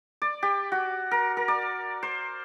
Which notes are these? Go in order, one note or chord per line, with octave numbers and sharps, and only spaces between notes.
D5
G4
F#4
A#4
A#4
D5
C5